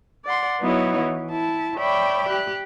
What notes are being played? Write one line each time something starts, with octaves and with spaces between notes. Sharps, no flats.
D5 F#5 C6
F#3 B3 D#4 E4 F#4 C#5
E3
E4 A5
C#5 D5 E5 G5 B5 D6
G4 F#6